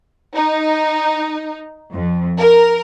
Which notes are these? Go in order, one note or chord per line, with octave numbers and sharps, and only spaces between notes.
D#4
F2
A#4